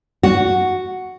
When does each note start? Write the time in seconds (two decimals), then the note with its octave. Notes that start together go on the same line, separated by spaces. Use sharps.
0.23 F#4